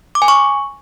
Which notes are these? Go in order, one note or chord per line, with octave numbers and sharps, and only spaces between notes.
D6
G#5
C#6